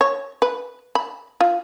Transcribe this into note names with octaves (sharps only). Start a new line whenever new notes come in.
C#5
B4
B5
F4